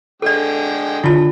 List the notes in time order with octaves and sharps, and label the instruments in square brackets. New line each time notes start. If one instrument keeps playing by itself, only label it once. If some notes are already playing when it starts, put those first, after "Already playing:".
[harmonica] D3 G#3 G5 [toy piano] A4 D5
[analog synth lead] D3 [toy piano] E4 F4 A5